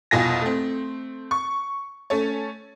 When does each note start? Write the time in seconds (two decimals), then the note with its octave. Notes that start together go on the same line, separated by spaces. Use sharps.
0.11 C2 F2 B2 F4 G#5 A#6
0.41 A3 C4
1.31 C#6
2.10 A3 C#4 A4 C#5